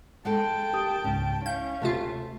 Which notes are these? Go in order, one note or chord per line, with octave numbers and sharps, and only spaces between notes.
G#3 G#4 A4 G5 A5
G4 A#4 D#6
C#2 G#2 C#4
C#4 E4 F5 G6
D2 C3 A3 F4 E5